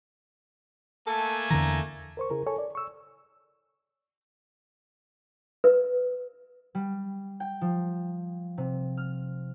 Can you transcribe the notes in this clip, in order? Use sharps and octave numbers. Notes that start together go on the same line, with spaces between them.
A3 A#3 A4 G#5
E2 D3 E3 A#5
A#4 C5 C#6
C#3 E4 G#4 A#4
A4 C#5 G#5 C#6
D5
C#6 E6
B4
G3
G5
F3
C3
F6